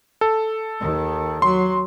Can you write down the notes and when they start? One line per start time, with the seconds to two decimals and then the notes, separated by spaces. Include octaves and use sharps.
0.21 A4
0.80 D#2 D#3
1.42 F#3 C6